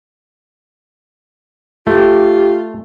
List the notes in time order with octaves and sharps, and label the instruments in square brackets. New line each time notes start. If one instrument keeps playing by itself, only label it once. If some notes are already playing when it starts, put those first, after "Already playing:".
[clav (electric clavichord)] A3 [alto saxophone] F4 [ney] G4